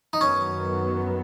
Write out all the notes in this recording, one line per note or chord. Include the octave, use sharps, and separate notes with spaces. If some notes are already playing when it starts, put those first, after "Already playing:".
D#4
F#2 D#3 F#3 B3 C#4